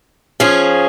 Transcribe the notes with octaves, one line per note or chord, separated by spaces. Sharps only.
F3 C#4 G#4